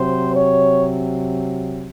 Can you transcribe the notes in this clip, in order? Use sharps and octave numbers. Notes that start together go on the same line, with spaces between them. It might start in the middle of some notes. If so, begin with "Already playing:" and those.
Already playing: C3 F#3 C5
C#5